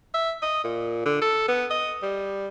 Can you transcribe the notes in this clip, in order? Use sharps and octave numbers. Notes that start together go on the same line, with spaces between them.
E5
D#5
A#2
D3
A4
B3
D#5
G3